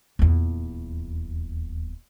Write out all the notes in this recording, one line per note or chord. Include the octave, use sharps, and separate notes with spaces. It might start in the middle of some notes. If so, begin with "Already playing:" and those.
D#1 E2